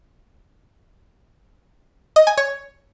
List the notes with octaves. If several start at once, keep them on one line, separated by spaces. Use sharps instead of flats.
D#5
G#5
C#5